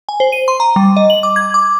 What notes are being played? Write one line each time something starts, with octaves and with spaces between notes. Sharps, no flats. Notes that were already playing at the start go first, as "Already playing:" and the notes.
G#5
C5
D#7
C6
A#5
G3
D#5
F#7
D6
G#6
D6